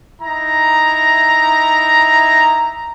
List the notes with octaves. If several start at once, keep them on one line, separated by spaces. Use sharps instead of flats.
D#4 E4 A#5